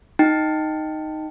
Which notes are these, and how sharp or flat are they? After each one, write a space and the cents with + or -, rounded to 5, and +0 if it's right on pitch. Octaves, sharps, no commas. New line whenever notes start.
D#4 +0 G5 +0